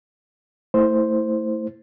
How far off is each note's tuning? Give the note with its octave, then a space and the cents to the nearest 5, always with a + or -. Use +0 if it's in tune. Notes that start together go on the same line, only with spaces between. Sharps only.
A3 +25 E4 -15 C5 +0